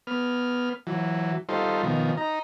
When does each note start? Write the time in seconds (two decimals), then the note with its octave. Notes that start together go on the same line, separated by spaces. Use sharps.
0.07 B3 F6
0.87 E3 F#3
1.49 G3 D#4 F4 A4 C5
1.83 B2 D#3 F3
2.17 D#4 A#5